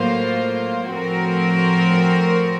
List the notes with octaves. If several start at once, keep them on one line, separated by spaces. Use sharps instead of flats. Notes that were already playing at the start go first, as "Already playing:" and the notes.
Already playing: A2 F#3 A#3 F4 C5
A2 F3 C4 F#4 A#4